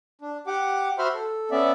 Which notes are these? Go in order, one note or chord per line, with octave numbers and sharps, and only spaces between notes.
D4
G4 F#5 D6
F#4 C5 E5 B5 C6 F6
A4
B3 C#4 D5 E5